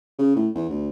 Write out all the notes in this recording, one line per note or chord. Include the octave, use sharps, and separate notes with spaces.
C#3
A2
E2
D2